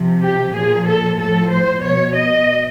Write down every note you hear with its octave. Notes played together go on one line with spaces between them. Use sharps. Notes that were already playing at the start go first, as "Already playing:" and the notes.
Already playing: C3 F3
G4
A#2 F3 G#4
A4
A2 F3 A4
C5
B2 C#5
D#5